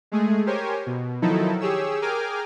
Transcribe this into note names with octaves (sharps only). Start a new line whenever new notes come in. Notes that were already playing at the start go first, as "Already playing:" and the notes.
G#3 A3 G#4
G4 A#4 C5 C#5 G#5
B2
D#3 F3 F#3 D#4 E4 A4
G4 G#4 C#5 E6
G#4 A#4 G5 G#5 D6 F6